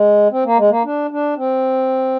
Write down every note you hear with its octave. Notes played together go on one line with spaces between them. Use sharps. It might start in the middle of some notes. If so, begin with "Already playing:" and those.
Already playing: G#3
C4
A#3
G#3
A#3
D4
D4
C4